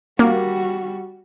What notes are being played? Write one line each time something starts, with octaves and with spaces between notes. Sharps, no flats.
G3 A#3 F#4